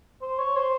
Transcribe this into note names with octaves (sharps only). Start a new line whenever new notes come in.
C5
C#5
C5